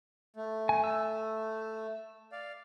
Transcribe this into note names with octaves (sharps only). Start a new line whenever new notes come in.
A3
G#5
E6
D5 F5